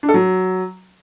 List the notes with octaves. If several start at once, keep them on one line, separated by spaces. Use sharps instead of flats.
D4
A4
F#3